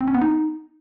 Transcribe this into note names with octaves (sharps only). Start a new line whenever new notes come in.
C4
C#4
B3
D#4